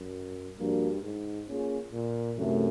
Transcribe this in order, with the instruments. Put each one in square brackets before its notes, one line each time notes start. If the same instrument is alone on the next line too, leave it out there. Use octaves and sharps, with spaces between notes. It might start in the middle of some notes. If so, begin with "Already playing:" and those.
Already playing: [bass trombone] F#2
[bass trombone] G2 [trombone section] F3 A#3 D4 F#4
[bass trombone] G#2
[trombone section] A#3 C#4 F4 G#4
[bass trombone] A#2
[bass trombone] F#2 [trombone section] C3 E3 A3